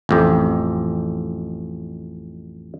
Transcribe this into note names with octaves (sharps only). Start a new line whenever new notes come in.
A1 F2 G4